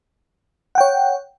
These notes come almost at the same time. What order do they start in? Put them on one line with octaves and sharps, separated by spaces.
F#5 G5 C#5